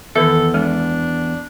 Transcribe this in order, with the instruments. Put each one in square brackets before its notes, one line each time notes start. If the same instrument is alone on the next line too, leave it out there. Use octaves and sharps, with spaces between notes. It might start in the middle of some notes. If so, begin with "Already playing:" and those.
[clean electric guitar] E2 [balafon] D#3 E5 [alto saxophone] A4
[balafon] G#3 [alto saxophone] D4